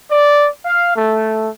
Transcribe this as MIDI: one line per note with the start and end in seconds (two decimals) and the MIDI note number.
0.10 0.47 74
0.65 0.95 77
0.95 1.48 57